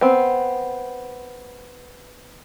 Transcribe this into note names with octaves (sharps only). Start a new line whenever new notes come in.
B3 C4